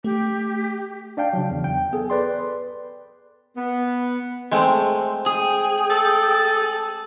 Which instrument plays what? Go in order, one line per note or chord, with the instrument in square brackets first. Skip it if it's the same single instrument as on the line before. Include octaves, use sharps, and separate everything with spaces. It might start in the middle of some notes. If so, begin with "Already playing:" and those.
[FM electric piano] A3 [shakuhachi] G4
[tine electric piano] D4 D5 F5 G5 A5
C#3 F#3
E2
G5
B3 G#4 A4
B4 D5 C6
[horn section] B3
[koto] G#3 A3 C4
[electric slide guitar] G#4 [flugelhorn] G5
[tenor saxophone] A4